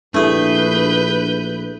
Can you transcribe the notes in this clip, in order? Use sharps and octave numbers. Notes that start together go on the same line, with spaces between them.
A#1 A3 D4 E4 G4 G#4 B4 G6